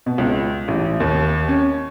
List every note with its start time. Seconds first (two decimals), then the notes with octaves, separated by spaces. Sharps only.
0.06 B2
0.18 C#2
0.68 A1
1.00 D#2
1.48 C#4